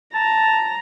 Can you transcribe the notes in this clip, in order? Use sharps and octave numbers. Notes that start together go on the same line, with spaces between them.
A5 A#5